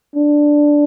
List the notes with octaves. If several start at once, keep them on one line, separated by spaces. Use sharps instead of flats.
D4